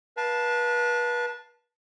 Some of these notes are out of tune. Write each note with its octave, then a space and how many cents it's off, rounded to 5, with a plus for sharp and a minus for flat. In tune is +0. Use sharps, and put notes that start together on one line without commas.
B4 -35 F5 +0 A5 +0